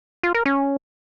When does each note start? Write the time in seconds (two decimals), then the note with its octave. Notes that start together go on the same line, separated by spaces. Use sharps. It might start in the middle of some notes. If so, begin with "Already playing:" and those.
0.23 F4
0.34 A#4
0.46 C#4